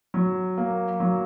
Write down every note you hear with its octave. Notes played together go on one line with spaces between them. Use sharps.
F#3
A#3
F#3